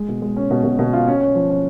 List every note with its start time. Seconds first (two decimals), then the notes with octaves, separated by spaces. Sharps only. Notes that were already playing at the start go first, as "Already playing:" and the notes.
Already playing: G#3
0.08 B2
0.22 G#3
0.36 C#4
0.51 B2
0.64 B2
0.79 B2
0.93 F4
1.07 C#4
1.21 C#4
1.35 F3
1.50 C#4